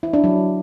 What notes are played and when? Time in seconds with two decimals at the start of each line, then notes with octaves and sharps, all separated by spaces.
0.03 E4
0.13 D4
0.24 F#3